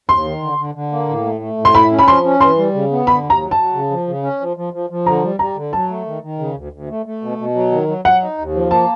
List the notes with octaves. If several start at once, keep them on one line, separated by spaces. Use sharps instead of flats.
D#2 C6
D#3
D3
D3
D3
A#3
A2
A3
A3
A2
C6
E4 B5
C#4
B5
F3 C6
C#4
E3 C6
G3
C#3
B3
D3 B5
D#2
A#5
F#3
A5
F#3
C#3
F3
C#3
C#4
F3
F3
F3
F3
D3 A#5
G3
G3 A#5
D3
F#3 A5
A3
D#3
D#3
C#3
D2
D2
A3
A3
B2
B2
F#3
D#3
F#3
F#3 F#5
D#4
D#2
F3
A#3 A5